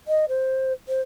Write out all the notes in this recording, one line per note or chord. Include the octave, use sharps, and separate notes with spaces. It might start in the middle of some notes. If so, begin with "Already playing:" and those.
D#5
C5
C5